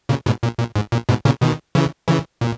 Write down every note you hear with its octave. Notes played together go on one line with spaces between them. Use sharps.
A#2 C#3
G#2 B2
A#2
A#2
G#2
A#2
G#2 B2
A#2 C#3
B2 D#3
C#3 E3
C#3 E3
A#2